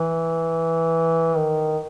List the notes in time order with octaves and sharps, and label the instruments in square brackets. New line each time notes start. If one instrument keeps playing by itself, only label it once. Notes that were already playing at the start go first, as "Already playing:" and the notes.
Already playing: [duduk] E3
D#3